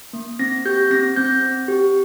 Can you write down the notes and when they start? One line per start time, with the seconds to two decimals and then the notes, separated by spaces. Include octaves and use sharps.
0.13 A#3
0.39 C4 A#6
0.65 G4 G6
0.91 C4 A#6
1.16 C4 G6
1.43 C4
1.68 G4